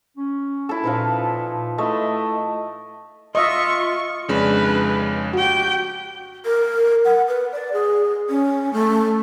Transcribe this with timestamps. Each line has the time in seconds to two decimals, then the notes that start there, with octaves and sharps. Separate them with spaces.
0.17 C#4
0.69 E4 A4
0.84 A#2 F3 D#4 B4
1.78 A3 E4 D#5
3.35 F4 D#5 E5 C6 C#6
4.29 F2 C#3 G#3 D4 B4
5.33 F#4 G4 G5
6.45 A#4
7.05 F#5
7.28 B4
7.52 D5
7.73 G#4
8.29 C#4
8.73 A3